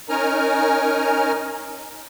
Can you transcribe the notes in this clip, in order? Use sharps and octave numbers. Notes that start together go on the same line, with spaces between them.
C#4 D#4 A#4 G#5 A#5 F6